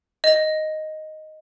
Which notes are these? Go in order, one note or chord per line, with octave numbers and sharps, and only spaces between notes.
D#5